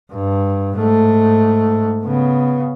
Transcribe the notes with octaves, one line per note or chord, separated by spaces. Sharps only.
G2
G#2 A3
C#3 B3